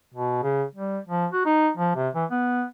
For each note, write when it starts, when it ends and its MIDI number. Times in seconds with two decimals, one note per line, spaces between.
0.15 0.38 47
0.43 0.64 49
0.75 0.99 55
1.08 1.26 53
1.33 1.44 66
1.46 1.70 63
1.78 1.95 53
1.96 2.09 48
2.15 2.25 52
2.31 2.64 59